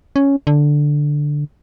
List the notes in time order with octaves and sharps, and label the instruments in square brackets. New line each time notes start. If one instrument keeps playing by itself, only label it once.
[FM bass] C#4
D3